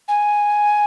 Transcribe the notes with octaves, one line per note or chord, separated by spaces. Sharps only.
G#5